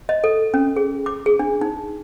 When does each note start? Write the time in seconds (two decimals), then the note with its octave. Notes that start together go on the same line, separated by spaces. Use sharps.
0.09 D#5
0.24 A4
0.54 C#4
0.76 G#4
1.06 D6
1.26 G#4
1.39 D4
1.61 D#4